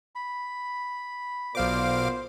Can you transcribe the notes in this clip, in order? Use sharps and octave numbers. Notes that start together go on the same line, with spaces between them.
B5
B1 A#2 B3 C5 F5 D6